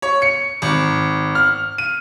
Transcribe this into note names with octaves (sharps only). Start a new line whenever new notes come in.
C#5
C#7
G#1
F6
D#7